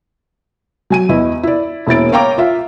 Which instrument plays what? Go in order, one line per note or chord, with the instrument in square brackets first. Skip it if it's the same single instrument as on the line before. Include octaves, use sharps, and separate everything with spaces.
[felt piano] F#3 G#5 D#7
E2 E4 D#5
E4 D5
E1 A#3 E4 E5 A6 D7
A#4 C#5 F5 G5 A#5 D6
F4 E5 F5